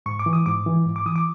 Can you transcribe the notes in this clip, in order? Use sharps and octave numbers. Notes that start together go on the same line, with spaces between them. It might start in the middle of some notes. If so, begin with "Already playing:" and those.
G#2 C#6
D6
E3
D#6
G#2 D6
E3
G#2
D6
E3 D#6
D6